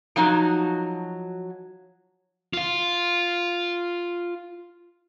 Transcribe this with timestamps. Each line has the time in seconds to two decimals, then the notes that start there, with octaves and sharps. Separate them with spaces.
0.16 F3 F#3 D#4 F#4
2.53 F4 F5